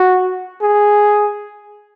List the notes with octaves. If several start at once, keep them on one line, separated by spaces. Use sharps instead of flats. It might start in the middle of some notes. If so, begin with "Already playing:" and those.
Already playing: F#4
G#4